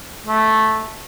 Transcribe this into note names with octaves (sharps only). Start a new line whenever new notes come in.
A3